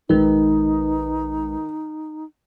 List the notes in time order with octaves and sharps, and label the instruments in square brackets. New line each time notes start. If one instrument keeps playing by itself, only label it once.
[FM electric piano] A#1 G#3 B4 [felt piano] D#3 [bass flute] D#4